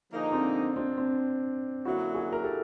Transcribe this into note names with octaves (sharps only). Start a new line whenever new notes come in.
D3 F3 A#3 D#4 G#4
C4 D4
C4 D4
C4 D4
F#2 D3 F#3 A#3 E4 F#4
F#4 G#4
A#4
G4 A4